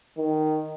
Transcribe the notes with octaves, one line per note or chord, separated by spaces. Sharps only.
D#3